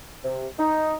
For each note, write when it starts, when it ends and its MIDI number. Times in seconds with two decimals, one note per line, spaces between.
0.23 0.46 48
0.58 0.95 63